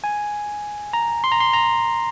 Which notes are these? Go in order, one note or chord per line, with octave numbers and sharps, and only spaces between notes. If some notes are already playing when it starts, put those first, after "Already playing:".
G#5
A#5
C6
A#5
C6
A#5